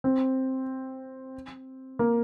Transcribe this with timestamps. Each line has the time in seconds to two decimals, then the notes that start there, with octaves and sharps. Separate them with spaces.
0.04 C4
1.99 A#3